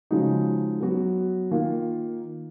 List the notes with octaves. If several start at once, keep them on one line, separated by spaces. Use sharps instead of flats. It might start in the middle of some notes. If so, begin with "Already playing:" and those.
C#3 F3 G#3 D#4 F#4
F#3 B3 F#4
D#3 A#3 F4